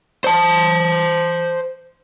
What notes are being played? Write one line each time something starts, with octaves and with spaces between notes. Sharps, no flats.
C5 A5